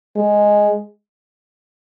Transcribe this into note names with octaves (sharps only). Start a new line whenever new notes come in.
G#3